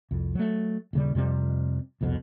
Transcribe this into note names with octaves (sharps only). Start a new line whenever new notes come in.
C2 F2
F#3 A3
D#1 C#3 G3
F2 C3 G3 C4
E1 C2 F2 B2